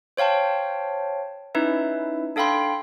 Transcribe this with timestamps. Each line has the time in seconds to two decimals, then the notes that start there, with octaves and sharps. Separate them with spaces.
0.17 C5 C#5 F5 G5 A5
1.55 C#4 D#4 E4 B4 E5
2.36 D4 A4 F5 G5 B5 C6